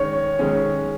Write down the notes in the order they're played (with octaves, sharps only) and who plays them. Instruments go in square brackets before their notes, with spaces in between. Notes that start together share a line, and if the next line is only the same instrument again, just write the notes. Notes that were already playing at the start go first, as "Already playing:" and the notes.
Already playing: [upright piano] D#3 G#3 C#4 [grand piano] C#5
[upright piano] D#3 G#3 C#4